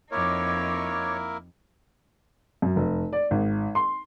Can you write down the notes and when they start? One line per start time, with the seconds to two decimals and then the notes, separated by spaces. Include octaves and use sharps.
0.12 F2 A#3 D#4 E4 A#4 C#5 D6
2.62 F#2
2.76 F1
3.13 D5
3.31 G#1
3.75 C6